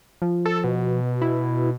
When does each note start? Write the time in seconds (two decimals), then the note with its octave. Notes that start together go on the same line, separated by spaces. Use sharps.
0.22 F3
0.45 A4
0.64 B2
1.22 E4